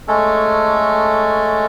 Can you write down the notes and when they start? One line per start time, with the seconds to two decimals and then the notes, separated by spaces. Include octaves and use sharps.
0.08 G#3 A3 C#4 A4